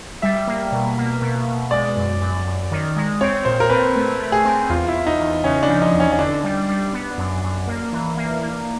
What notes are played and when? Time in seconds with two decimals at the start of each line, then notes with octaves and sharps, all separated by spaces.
0.22 G3 E5
0.48 A#3
0.72 B2
0.98 A#3
1.22 B2
1.47 B2
1.71 G#3 D5
1.97 F#2
2.21 F#2
2.47 F#2
2.71 D#3
2.96 G#3
3.21 C4 C#5
3.45 A#2 C5
3.60 A#4
3.70 C4 B4
3.96 A3
4.19 A3
4.32 G#4
4.45 C4
4.70 E2 F4
4.88 E4
4.94 E2
5.07 D#4
5.19 E2
5.44 C#3 C#4
5.63 D4
5.68 F3
5.82 D#4
5.94 E2
6.00 C#4
6.12 C#4
6.19 D3 D4
6.44 G3
6.69 G3
6.93 B3
7.18 F#2
7.43 F#2
7.67 A#3
7.93 E3
8.17 A#3
8.41 A#3